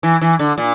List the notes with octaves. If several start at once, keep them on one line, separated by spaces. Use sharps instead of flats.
E3
E3
D3
A#2